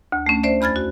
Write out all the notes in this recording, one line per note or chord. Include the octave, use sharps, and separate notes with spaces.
D2
A3 C#4
C5 D5 E5
E2 B5 F6 G#6 A6
F#4